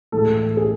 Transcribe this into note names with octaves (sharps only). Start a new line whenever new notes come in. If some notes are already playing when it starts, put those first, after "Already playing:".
A2 E3 G#3 A4
G#4